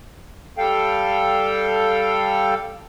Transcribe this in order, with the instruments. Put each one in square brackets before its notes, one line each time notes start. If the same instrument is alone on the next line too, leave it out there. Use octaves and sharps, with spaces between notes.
[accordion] G3 A4 F5 G5